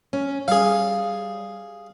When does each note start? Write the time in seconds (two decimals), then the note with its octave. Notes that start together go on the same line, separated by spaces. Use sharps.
0.13 C#4
0.48 G3 G#4 F5